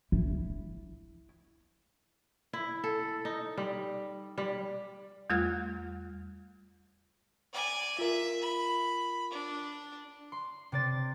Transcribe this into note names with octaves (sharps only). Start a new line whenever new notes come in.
E4
E4
A4
D#4
G3
G3
E2 G3 A3 F4 F6 F#6
D5 G#5
F4 A#4 E5
B5
D4
C6
C3 D5 A6